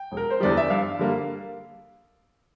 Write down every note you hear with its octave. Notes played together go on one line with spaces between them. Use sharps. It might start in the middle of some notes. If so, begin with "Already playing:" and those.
Already playing: G5
E1
A#4
C5
E2 D3 G3 D5
E5
G2 F5
D3 G3 A#3